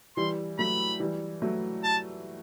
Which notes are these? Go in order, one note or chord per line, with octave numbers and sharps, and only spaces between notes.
E3 G3 C6
F#3 A3 B5
E3 G3
F#3 A3
A5